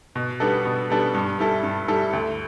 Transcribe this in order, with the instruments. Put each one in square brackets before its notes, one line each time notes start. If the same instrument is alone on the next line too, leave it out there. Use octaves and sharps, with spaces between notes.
[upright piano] B2
G3 B3 D4 A4
B2
G3 B3 D4 A4
G2
G3 E4 A4
G2
G3 E4 A4
D2